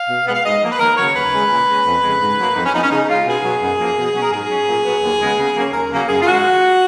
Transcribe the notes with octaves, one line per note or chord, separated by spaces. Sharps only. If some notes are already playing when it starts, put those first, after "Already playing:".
Already playing: F5
B2
G#3 B3
F5
G#2 D#5
F3 A#3
B4
D#2 A#4
C#3 F#3 C#5
D#2 B4
C#3 G#3 C#4
A#2
G#3 C#4
F2
C#3 G#3
G#2
F#3 A#3
F2 D#4
C#4
F3 B3 D#4
C#4
C#3 D#4
G#3 C#4 F4
B2 G#4
F#3 B3
F#2
F3 A#3
B2
F#3 C#4
A#4
G#2 G#4
F#3 C#4
A#2
F#3 B3
D#2
C#3 G#3 B3
C#3
F#3 A#3 C#4
D#2 A#4
C#3 F#3 A#3 C#4
F#2 G#4
F4
D#3 G#3 F#4